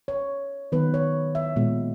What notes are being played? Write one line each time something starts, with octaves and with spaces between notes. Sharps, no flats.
C#5
D#3 F#3 B3 B4
C#5
E5
A#2 G#3 B3